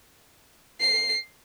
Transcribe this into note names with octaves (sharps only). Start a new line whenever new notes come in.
C7